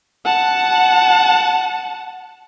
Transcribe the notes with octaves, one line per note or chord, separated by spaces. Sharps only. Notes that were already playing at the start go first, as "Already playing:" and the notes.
F#5 A5